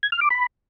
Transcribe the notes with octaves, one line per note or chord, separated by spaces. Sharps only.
G#6
F6
D6
B5